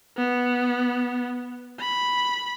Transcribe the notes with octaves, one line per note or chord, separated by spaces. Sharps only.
B3
B5